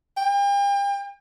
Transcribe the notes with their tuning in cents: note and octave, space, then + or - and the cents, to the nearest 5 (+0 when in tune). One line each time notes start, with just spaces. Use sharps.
G5 +40